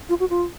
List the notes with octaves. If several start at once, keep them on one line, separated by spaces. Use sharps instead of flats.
F4
F#4
F4